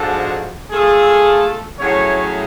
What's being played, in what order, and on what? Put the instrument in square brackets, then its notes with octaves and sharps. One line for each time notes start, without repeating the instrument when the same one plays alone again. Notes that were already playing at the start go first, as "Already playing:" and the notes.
Already playing: [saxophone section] G#2 F3 G#3 D4 F#4 [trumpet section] A4
[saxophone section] A3 F4 A4 F5 [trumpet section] G#4
[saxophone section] A2 F#3 A3 C#4 G#4 [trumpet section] C#5